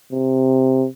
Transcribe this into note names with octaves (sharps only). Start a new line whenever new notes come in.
C3